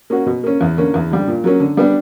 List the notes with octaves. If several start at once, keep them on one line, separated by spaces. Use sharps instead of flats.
A#3 C#4 F#4
B2
A#3 C#4
E2
D3 A#3 C#4
E2
D3 G3
A#2
F#3 A#3 C#4
D3
G3 B3 D4